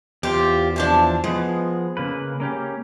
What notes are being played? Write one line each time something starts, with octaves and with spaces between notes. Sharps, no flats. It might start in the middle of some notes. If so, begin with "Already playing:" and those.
E2 F4 G4 C5
E3 F3 D4
F3 G#3 B3
C#3 A#3 B4
A#3 C#4 G4